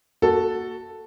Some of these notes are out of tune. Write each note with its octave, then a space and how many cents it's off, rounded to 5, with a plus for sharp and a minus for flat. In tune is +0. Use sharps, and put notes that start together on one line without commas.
A#3 +0 F#4 +0 A4 +0